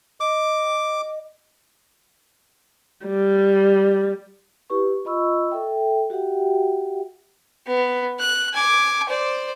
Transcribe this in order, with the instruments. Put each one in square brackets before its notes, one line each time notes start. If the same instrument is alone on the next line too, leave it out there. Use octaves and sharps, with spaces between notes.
[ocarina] D#5 [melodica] D6
[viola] G3
[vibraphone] E4 G4 B4 C#6
F4 D#5 B5 C#6 E6
A4 E5 G5
F#4 G4 E5 F#5 G5
[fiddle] B3
F#6
G#5 D6
C5 D5